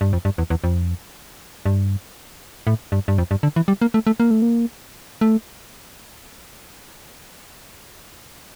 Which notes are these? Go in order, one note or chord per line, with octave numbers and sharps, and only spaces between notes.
G2
F2
G2
E2
E2
F2
G2
A2
G2
G2
F2
G2
D3
E3
G3
A#3
A3
A3
A#3
A3
A#3
A3